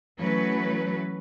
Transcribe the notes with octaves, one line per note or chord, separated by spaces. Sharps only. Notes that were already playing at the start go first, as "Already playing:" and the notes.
E3 F#3 A3 C#4 F#4 B4